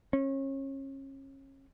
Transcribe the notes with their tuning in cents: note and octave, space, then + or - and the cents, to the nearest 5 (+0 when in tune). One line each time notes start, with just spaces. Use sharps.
C#4 -30